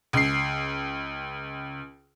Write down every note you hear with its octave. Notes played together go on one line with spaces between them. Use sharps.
C#2 C7